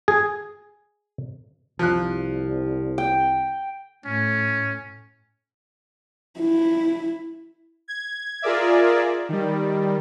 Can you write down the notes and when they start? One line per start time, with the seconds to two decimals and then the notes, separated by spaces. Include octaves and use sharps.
0.08 G#4
1.79 C2 F3 F#6
2.98 G5
4.05 A2 C#4
6.40 E4
7.88 G#6
8.42 F4 G#4 A#4 D5 E5
9.29 D#3 G3